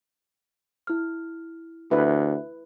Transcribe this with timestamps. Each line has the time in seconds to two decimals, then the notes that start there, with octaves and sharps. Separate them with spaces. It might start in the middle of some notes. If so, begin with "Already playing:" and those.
0.87 E4 F6
1.91 D2 E4 B4 E5